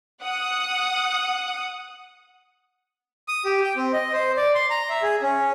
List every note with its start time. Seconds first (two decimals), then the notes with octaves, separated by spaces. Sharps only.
0.22 F#5 D#6
3.28 D#6
3.45 G4
3.64 G5
3.76 C4
3.93 D#5
4.13 C5
4.37 D5
4.55 C6
4.70 A#5
4.89 E5
5.02 G#4
5.22 C#4